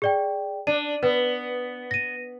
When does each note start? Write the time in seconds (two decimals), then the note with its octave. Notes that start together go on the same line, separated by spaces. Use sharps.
0.02 G#4 D5 G5
0.67 D4 D#7
1.03 B3 B4
1.91 A#6 D#7